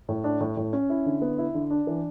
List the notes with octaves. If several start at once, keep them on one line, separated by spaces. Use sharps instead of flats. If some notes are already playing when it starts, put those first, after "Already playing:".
A2
D4
A2
A2
C#4
E4
D3
B3
E4
D3
D4
E3